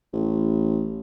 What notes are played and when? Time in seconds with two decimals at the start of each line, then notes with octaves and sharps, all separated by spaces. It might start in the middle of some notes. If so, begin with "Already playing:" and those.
0.13 A1